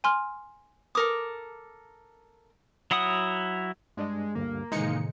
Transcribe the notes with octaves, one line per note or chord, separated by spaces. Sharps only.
G#5 C6 F6
A4 A#4 D6 D#6
F#3 E4 F#5 D#6
G2 G#3 D4 D#5
D2 G2 D3 A#3
A2 C3 D#3 E3 G#3 D#4 C#7